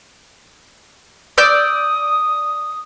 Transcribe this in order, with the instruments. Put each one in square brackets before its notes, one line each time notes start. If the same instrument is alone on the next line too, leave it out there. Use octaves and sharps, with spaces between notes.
[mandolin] D5 E6 G6 [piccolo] D#6